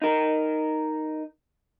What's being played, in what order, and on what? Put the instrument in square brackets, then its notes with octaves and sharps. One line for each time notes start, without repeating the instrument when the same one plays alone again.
[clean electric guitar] D#4 A#4